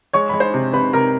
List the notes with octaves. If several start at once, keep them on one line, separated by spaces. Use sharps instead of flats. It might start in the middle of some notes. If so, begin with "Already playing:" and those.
G#3 C#5 C#6
G#3 B5
C5 C6
C3
C3 B4 B5
C3 A#4 A#5